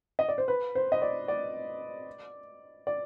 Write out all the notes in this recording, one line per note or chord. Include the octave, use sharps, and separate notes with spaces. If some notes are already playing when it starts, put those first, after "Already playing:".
D#5
D5
C5
B4
C5
D#5
D5
D5
D5